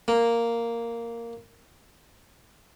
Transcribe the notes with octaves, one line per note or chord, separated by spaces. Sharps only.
A#3